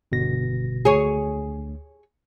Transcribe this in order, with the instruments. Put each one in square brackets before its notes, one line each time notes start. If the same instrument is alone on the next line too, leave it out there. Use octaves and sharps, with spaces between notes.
[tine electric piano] G1 B2 A#6
[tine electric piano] D2 [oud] G#4 C#5